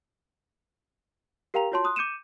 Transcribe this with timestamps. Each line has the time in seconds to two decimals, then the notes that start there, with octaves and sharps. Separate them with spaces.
1.54 G4 A#4 F5 G5 A#5 F7
1.72 F4 F#4 C#5 A5 C6
1.84 C6 D#6 F#6
1.96 D6 G6 C#7 D#7 E7